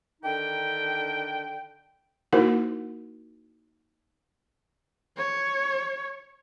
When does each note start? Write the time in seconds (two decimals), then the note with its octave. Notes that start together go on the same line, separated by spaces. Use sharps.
0.22 D3 D#3 D4 D#4 G5
2.33 A#3 D#4 E4 F#4 A#4 C5
5.17 C#5